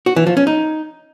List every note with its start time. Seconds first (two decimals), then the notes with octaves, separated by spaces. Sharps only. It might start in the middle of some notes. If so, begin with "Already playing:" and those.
0.06 F#4
0.16 E3
0.27 F3
0.37 C#4
0.47 D#4